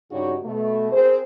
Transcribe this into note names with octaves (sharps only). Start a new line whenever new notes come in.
G2 C#3 D#4 F#4 G4 C#5
B2 A3
C4 G#4 A#4 C5